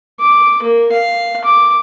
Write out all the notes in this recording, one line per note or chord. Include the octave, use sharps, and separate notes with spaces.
D6
A#3
F5
D6